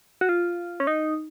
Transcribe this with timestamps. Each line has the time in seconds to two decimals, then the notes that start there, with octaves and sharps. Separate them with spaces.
0.21 F#4
0.29 F4
0.80 C#4
0.87 D#4